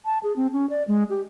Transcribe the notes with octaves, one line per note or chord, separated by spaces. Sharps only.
A5
G#4
C4
C#4
D5
G#3
G4